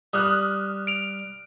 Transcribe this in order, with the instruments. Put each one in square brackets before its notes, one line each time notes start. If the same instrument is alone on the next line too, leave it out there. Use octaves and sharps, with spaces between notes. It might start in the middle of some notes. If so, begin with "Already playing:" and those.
[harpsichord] G3 [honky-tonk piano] D#6 F6 F#6
[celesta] D7 F7